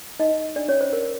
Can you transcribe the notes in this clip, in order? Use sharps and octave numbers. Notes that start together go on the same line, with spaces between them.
D#4 D#5
D4 D5
C#4 C#5
C5
A#4